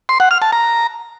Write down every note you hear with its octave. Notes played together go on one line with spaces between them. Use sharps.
C6
F#5
F6
A5
A#5